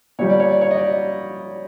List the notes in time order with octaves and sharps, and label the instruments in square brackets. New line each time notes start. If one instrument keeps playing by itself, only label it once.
[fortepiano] A#2 G3 C#5
D5
C#5
D5
C#5
D#5
D5